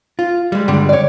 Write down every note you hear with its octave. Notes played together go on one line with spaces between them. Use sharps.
F4
G3 G#3
G2 D3 G3 G#3
C#5 D5